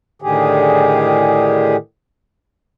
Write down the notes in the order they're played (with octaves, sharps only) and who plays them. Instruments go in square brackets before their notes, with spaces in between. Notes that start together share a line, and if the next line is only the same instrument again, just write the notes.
[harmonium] A2 D3 D#3 G4 G#4